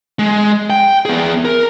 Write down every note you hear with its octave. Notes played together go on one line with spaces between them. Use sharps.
G#3
G5
B3 G#4
A#4